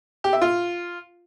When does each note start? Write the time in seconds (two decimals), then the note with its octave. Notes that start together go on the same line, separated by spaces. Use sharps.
0.24 G4
0.33 E5
0.42 F4